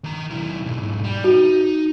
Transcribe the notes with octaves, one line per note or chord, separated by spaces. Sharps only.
D#3 A#5
B1 E4
B1 G#2
G3
D#4 F#4